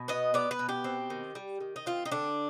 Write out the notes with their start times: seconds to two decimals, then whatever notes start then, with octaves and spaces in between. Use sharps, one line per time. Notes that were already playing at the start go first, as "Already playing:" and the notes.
Already playing: B2
0.08 B3 D#5
0.34 B3 D5
0.51 B4
0.59 B2
0.69 G4
0.84 C4
1.10 D#3
1.35 G3
1.60 D#3
1.76 D#4
1.86 C4 F4
2.05 D#4
2.12 D3 D4